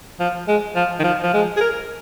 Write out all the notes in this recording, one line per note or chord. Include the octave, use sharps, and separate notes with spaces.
F3
G#3
F3
D#3
F3
F3
G#3
G#4
A#4